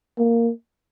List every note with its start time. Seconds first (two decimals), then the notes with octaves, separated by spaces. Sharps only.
0.18 A#3